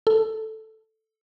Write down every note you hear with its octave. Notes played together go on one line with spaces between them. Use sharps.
A4